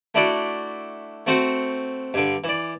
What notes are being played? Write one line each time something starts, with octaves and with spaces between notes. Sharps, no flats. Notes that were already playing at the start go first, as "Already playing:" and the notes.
A3 D4 E4 F#4 D5
A3 C4 F#4 C5 F#5
G2 D3
E3 D5